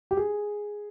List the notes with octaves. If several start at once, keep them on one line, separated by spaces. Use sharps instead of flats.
G4
G#4